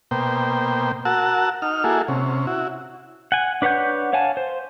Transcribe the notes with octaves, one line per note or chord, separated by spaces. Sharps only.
B2 A#3 C5 G5
F#4 A#4 F#5 A5 E6
D#4 F6
A#3 E4 F#4 G#4 A4
C3 C#4
E4 F#4
F#5 G#5
D4 B4 C#5 F#5 G6
C#5 F5 F#5 G#5 A5
C5